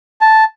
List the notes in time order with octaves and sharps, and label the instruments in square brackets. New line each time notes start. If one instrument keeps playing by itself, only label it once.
[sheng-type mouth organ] A5